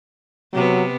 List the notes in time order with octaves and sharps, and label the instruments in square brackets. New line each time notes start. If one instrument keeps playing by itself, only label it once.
[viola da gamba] C3 B3 [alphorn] F#3